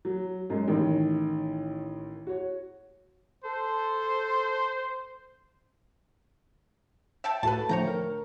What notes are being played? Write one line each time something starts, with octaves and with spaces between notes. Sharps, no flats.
F#3
F#2 G#3
A1 A2 D#3
F#4 C#5
A4 C5
E5 G5 A5
A2 F#4 A4 B4 A5
D3 F3 A3 C#5 G5 A#5
A#4